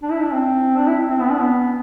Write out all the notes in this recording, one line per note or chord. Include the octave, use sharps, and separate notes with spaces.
D4
E4
D4
C4
D4
E4
C4
B3
D4
B3